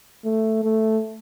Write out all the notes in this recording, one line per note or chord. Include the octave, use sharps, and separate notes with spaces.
A3
A3